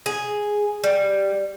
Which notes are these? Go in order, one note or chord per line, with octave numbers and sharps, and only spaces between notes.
G#4
G3